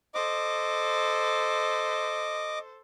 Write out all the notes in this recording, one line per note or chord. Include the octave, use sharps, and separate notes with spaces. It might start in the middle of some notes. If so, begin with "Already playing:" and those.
A4 C5 D#5 D6